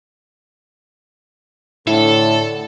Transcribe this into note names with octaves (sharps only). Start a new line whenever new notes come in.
A2 D3 E4 A4